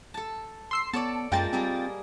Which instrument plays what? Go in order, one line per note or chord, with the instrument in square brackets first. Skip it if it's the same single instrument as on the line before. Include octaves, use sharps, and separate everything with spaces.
[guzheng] A4 A5
[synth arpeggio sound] C6 E6 C7
[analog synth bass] B3 [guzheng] A4 C#5 D5 [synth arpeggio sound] A5
[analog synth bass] F#2 [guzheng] G#3 A#3 A5 [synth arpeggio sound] F4 G5 A6
[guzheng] G3 A#3 G#4 [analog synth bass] C4